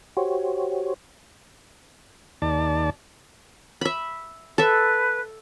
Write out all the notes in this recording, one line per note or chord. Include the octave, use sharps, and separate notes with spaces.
F#4 G4 C5 C#5
D#2 D5 A5
E5 B5
A4 B4 E5